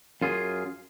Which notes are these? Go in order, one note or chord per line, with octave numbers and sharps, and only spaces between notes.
F#2 F4 G#4